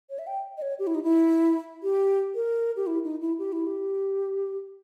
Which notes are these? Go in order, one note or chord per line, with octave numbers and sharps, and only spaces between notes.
C#5
E5
G5
D#5
C#5
G4
E4
D#4
E4
G4
A#4
G4
E4
D#4
E4
G4
E4
G4